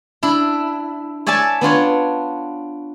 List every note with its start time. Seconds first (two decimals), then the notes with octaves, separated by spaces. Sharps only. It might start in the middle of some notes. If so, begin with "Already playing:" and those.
0.23 D4 E4
1.26 C#5 D5 E5 G#5 A5
1.61 B3 D4 F4 C#5